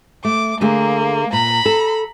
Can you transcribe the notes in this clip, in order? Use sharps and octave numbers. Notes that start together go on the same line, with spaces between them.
A3 D6
D3 A3 A#3 G#4
A#2 A#5 B5
A4